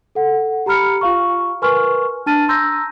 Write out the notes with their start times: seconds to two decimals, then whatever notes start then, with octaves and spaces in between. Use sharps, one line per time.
0.15 A4 F#5
0.66 G4 A#5 B5 F6 C#7
1.01 F4 F5 C#6
1.62 A#4 B4 G#5 C6 C#6 F6
2.26 D4 A5 F6 A6 D#7
2.48 A#5 C6 E6 G6 A#6